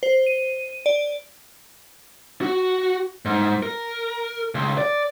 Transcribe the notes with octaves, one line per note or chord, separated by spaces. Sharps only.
C5
D#7
D5
F#4
G#2
A#4
C#2
D5